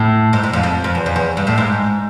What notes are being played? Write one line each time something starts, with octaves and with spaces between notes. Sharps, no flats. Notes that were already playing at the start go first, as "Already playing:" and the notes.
Already playing: A2
G#2
G#2
F2
F2
F2
E2
F2
E2
G2
A2
G#2